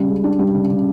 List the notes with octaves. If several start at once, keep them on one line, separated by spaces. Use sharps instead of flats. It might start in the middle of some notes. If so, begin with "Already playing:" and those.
Already playing: C#3 G3
C#2
D4
G3
C#3
C#3